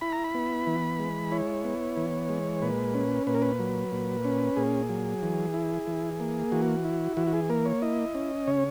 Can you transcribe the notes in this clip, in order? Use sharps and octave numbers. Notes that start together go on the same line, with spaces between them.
E4 B5
A#5
B5
B3
E3
G#3
E4 C#5
B3
E3
G#3
A#2 B4
C#4
A#2 B4
A#4
B4
F#3
A#2
C#4
A#2 G#4
F#3
E3
E4
E3
A#3
E3 F#4
E4
E3 F#4
F#4
G#4
A#3 A#4
C#5
E4 D#5
C#4
C#3 C#5